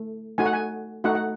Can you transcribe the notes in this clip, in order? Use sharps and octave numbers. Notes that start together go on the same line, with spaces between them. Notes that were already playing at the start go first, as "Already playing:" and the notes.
Already playing: A3
A3 D#4 F#4 G#5
F#5
G#5
A3 D#4 F#4 F#5
F#5